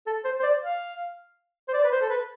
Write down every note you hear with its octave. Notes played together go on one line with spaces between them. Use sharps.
A4
C5
C5
D5
F5
C5
D5
B4
C5
A4
B4